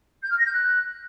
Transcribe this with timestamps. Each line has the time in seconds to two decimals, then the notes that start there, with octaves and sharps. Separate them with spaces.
0.22 G6
0.30 F6
0.38 A#6
0.45 G6
0.53 F#6